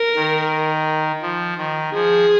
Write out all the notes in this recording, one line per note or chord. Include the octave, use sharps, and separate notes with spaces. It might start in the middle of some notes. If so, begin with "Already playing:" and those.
Already playing: A#4
D#3
F3
D#3
F3 G#4